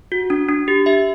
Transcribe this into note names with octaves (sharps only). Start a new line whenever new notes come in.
F#4
D4
D4
G4
G4 E5